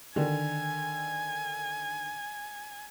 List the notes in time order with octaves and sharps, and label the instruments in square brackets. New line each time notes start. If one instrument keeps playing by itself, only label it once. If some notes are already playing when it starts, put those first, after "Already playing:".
[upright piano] D3 D#3 [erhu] G#5